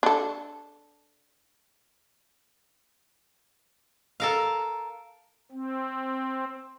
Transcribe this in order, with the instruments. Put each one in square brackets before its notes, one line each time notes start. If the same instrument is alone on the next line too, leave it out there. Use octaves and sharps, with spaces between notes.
[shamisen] D4 A4
[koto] A4 A#4 F5
[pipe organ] C4